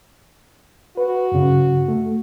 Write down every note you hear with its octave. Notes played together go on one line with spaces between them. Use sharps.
F#4 B4
F#2 C#3
A3